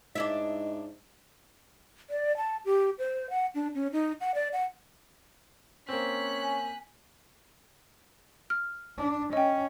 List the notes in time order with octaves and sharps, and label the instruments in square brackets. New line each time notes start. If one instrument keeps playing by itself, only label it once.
[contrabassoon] G#2 [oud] D4 E4 E5 [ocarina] D#5
[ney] D5
A5
G4
C5
F#5
D4
C#4
D#4
F#5
D5
F#5
[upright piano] A#3 C4 [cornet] C#4 [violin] F#6 B6
[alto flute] G#5
[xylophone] F6
[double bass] D4
[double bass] C#4 [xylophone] D#5 G5